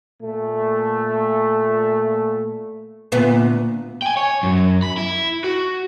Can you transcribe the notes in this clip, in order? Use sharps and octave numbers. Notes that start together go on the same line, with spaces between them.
A#2 A3
D2 A#2 B3
G5 G#5
C#5
F#2
B5
E4
F#4